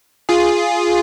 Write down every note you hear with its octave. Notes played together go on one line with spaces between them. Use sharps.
F4 G#4